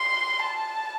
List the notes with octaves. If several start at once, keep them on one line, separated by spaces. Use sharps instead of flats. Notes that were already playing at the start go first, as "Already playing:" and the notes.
Already playing: C6
A5